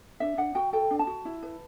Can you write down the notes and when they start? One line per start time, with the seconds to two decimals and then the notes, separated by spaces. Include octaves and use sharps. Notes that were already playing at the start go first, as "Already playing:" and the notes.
0.20 D4 E5
0.38 D4 F#5
0.55 F#4 G5
0.73 A4 G5
0.91 D4
0.99 A5
1.07 F#4
1.25 E4
1.43 B4